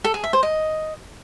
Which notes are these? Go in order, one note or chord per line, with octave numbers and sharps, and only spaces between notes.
A4
G#4
E5
C5
D#5